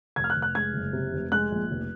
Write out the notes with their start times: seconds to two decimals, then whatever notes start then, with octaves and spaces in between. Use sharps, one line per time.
0.16 F1 G#6
0.24 F6
0.30 F#6
0.36 F1
0.42 F#6
0.55 G#3 G#6
0.74 F#1
0.93 C3
1.13 F1
1.32 G#3 F#6
1.51 A#1
1.71 F1